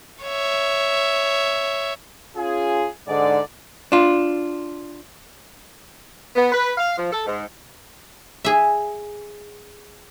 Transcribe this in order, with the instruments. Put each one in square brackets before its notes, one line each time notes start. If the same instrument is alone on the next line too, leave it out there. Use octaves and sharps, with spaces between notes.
[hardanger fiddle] C#5 E5
[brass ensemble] C#4 F4 G#4
G#2 D3 D5
[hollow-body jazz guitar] D4 F4
[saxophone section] B3
B4
F5
F3
A4
G#2
[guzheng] G#4 E5